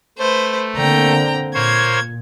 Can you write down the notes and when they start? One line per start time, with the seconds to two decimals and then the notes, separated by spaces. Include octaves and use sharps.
0.18 A3 B4 C5
0.77 D3 A#3 C4 G5 A#5
1.54 A#2 A#3 C5 C#5 G#6